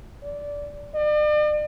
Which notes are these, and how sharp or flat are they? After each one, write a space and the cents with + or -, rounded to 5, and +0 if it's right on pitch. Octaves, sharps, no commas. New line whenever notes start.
D5 -15
D5 +45